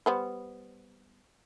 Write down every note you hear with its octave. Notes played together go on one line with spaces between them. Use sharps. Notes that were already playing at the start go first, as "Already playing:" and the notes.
G3 B3 C5